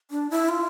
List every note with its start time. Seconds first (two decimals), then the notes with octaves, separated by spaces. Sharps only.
0.11 D4
0.30 E4
0.49 F4